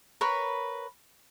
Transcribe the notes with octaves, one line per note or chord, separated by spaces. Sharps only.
A#4 B4 C#5 B5